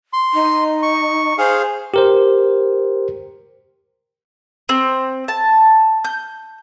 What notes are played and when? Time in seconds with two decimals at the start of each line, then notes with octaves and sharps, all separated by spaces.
0.13 C6
0.34 D#4
0.83 C#6
1.38 G#4 C5 F5
1.94 G4 A#4 C5
4.69 C4
5.28 A5
6.05 G6